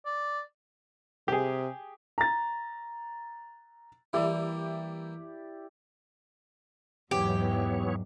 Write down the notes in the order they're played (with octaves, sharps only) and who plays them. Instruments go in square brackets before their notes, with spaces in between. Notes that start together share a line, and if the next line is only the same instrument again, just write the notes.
[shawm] D5
[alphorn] C3 [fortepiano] G4 G#4
[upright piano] A#5 A6
[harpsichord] E3 G3 A#3 [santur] E4 G4 D5
[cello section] E2 G#2 F#3 [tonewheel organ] E3 B3 C#5 [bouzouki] G4